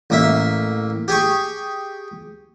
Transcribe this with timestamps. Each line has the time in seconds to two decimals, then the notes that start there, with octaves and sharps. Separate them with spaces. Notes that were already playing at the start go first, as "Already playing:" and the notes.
0.10 A1 A#3 E5
1.08 G4 G#4 C#6